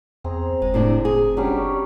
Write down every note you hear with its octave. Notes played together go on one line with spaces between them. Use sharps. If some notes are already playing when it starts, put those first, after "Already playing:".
E2 C4 G#4 A#5
F#1 G#3
A2 C3 D4
G#4
F#3 G3 C#4 D4